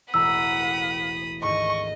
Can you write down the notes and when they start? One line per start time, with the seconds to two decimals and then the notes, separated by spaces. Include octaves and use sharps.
0.14 E1 A1 F#5 A#5 B5 D#6 E6
1.43 G#1 D2 G#2 D#5 C#6